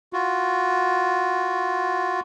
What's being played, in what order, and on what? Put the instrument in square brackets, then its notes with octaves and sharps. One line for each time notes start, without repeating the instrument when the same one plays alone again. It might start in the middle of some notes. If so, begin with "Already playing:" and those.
[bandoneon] F4 F#4